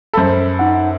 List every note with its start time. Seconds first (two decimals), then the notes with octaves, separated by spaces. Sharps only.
0.13 F#2 A4 C5 B5
0.59 D#4 F#5